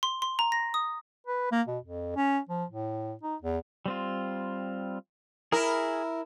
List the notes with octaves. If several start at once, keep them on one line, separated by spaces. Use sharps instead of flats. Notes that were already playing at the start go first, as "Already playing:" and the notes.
C6
C6
A#5
A#6
D#6
B4
A#3
B2
F2
C#4
F3
A2
D#4
E2
G3 C4 F4
E4 G#4 A#4 B5